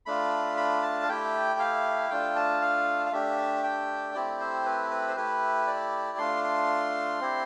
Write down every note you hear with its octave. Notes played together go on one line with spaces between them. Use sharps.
A3 D4 F4 B5
B5
A5
F5
A3 E4 G4 G5
F5
A3 D4 F4 G5
A5
F5
F5
A3 D4 G4 E5
G5
A3 C4 E4 G4 D5
C5
B4
B4
C5
A3 E4 G4 B4
D5
A3 D4 F4 C6
C6
C4 E4 G4